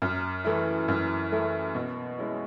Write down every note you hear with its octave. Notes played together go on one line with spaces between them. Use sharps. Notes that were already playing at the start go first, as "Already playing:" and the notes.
F#2
E3 A3 E4
F#2
E3 A3 E4
B2
G#3 C#4 E4